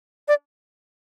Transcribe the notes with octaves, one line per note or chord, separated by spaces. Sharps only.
D5